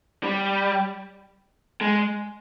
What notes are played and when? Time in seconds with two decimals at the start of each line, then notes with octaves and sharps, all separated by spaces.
0.23 G3
1.81 G#3